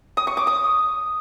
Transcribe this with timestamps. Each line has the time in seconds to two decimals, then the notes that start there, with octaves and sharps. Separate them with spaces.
0.17 D#6
0.27 C#6
0.37 D6
0.47 D#6